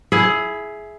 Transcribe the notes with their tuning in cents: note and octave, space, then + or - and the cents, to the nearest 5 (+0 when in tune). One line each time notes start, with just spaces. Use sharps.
E4 +0 G#4 +15 F5 +45